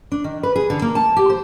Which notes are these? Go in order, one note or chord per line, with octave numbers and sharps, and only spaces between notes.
D4
D#3
B4
G#4
D3
A#3
A5
G4
C5